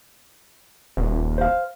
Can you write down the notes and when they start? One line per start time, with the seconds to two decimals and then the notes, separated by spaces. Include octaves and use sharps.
0.97 D#1
1.38 C5 F5